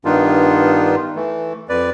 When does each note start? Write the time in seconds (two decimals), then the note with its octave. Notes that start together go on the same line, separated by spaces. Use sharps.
0.05 G2 D#3 B3 D4 D#4 F4
1.15 E3 A3
1.69 F2 B4 D5